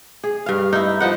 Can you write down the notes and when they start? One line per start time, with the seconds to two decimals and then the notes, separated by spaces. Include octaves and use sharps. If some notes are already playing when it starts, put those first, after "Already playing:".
0.24 G#4
0.46 G2 F5
0.73 D#4 E4
1.00 F3 D#4 F#5